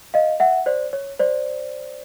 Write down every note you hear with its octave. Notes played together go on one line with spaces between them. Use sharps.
D#5 F5
E5 F#5
C5 D5
C#5
C5 D5